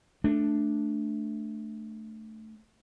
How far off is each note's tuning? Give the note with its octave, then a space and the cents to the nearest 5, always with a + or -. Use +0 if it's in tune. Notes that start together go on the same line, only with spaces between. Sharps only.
A3 +0 D4 +0